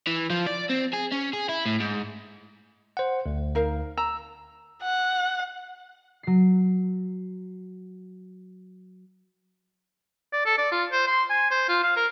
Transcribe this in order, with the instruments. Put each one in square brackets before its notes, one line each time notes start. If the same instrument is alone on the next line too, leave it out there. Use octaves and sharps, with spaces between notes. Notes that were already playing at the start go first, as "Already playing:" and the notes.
[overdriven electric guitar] E3
F3
D5
C4
G#4
C#4
G#4
E4
A2
G#2
[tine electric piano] C5 F#5
D2
[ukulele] D#4 A#4 F5
[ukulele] A#5 [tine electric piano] E6
[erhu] F#5
[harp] F#3 C7
[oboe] D5
A4
D5
F4
C5
C6
G#5
C5
F4
F5
A#4